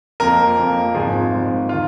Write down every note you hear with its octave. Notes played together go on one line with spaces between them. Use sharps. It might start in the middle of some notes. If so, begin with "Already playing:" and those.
F2 F3 A#3 A#4
F2 F3 A#3
G#1 G#2 F3 G#4
G#1 G#2 F3
D#3 F4